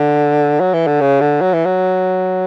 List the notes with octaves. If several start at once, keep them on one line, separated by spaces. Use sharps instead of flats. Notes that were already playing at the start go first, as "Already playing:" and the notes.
Already playing: D3
F#3
E3
D3
C#3
D3
F#3
E3
F#3